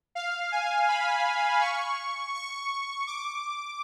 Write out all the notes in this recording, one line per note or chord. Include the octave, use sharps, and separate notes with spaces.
F5
G#5
B5
C#6
C#6
D6